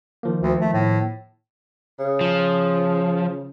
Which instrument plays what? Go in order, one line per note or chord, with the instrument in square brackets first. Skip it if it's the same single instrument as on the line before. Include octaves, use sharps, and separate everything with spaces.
[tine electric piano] D#3 F3 A#3
[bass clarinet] D2
A3
A2
[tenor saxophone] C#3
[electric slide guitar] F3